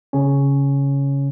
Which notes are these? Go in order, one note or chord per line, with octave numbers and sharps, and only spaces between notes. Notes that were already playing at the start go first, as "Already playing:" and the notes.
C#3 C#4